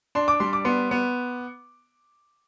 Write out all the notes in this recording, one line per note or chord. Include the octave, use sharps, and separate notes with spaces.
D4 C6
D6
G3 C6
D6
B3 C6
B3